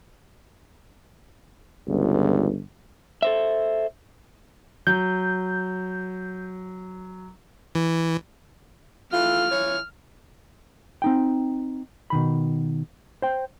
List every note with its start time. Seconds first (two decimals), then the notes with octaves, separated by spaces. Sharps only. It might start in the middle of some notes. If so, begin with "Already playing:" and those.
1.88 G1 C#2
3.22 A4 C5 E5
4.87 F#3 G6
7.75 E3
9.13 E3 A3 F4 F6
9.51 E3 F4 C#5
11.02 C4 D#4 G5
12.10 B2 D#3 B5
13.22 C5 G5